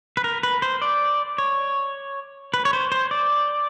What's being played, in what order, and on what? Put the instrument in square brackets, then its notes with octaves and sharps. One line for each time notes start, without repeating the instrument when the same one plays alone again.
[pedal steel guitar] B4
A#4
B4
C5
D5
C#5
B4
C#5
C5
C5
D5